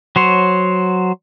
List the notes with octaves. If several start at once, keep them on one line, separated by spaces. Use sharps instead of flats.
F#3 C5 C#5